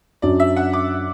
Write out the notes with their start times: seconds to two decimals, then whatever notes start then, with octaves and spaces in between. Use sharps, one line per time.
0.22 F#2 F#3 D4 D5
0.40 E5
0.56 F#5
0.73 D6